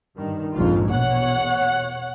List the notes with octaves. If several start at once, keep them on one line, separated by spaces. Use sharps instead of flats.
G2 D#3
A#1 F2 G#2 F4
E2 B2 C#5 F#5